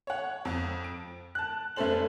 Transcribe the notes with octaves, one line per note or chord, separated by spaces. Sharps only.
C#5 F#5
F2
D7
A5 F#6
F1 A3 C#4 A4 C5 F#7